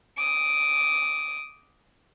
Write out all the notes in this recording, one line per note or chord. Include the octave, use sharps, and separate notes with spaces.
D6 D#6